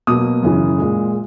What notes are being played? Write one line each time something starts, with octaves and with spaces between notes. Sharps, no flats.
B2 F#3 A#3 D#6
F#2 C#3 E3
A#2 G#3